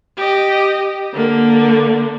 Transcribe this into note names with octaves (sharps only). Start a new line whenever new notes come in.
G4 D#5
D3 A#3